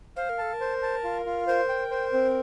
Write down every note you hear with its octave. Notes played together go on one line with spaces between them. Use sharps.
C5 F5
A#4
A4 A5
A#4
C5
A5
F4
F4
A#4 C5
G5
C5
C4